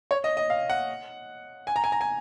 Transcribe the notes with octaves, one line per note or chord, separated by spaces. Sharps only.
C#5
D#5
D#5
F5
F#5
G#5
A#5
G#5
A#5
G#5